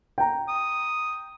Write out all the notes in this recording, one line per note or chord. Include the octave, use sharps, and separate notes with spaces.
G5 A#5
D#6